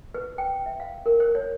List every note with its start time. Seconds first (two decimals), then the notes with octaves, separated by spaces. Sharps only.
0.14 B4
0.38 G5
0.66 E5
0.80 F5
1.06 A#4
1.20 C5
1.35 C#5